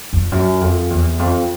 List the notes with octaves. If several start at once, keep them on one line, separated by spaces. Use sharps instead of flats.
F2
F#2
F2
E2
F2